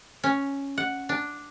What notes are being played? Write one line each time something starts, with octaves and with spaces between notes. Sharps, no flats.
C#4
F#5
D4